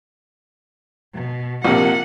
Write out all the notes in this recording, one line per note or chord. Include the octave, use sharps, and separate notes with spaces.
B2
A#1 C3 A#3 F#5